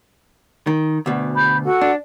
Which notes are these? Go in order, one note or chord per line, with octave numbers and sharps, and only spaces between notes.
D#3
D2 B2
B5 G6
F#4 A4 F#5
D4